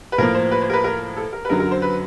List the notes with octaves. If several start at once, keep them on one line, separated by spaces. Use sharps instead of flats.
B4
A2 F3 A#3 A#4
C5
B4
C5
A#4
B4
A#4
A4
A#4
B4
F#2 D3 F#3 A#4
A#4
C5
B4